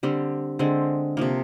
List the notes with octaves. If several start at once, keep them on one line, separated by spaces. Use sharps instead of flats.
D3 G3 C4 G4
D3 G#3 C4
C3 F3 A#3